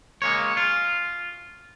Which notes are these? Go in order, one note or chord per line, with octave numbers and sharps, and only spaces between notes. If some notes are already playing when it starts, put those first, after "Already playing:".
G#3 A#3 C#5
F4